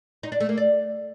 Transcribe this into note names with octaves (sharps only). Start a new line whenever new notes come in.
D#4
D4
A3
A#3
D5